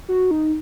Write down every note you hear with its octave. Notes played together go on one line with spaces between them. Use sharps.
F#4
D#4